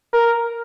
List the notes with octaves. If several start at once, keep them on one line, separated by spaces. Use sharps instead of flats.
A#4